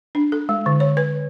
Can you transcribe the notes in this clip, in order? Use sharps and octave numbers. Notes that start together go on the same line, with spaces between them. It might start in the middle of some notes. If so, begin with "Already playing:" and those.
D4
A4
G#3
D3
C#5
B4